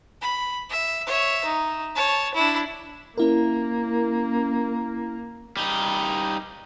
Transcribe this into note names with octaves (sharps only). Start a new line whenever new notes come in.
B5
E5
C#5 E5
D#4
C#5 A5
D4 E4
A#3 C#4 E4 A#4
G3 D#4